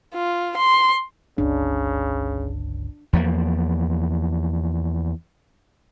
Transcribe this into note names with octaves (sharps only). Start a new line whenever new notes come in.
F4
C6
G1 C#2 C#3 D4
E2 F3 A#3